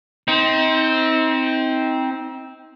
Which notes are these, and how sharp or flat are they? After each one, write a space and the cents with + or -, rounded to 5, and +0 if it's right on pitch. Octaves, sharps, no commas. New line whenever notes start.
C4 +0 D#4 +35